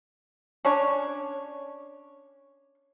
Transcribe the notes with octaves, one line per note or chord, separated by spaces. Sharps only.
C#4 D4 C#5